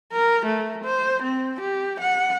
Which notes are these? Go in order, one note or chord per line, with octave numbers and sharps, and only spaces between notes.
A#4
A3
C5
C4
G4
F#5